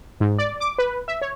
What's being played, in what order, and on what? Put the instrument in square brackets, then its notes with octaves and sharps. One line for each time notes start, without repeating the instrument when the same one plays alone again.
[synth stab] G#2
D5
D6
B4
E5
C#5